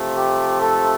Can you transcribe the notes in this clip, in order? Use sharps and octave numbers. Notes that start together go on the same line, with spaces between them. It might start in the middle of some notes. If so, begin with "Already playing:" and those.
Already playing: C3 F3 A3
G4
A4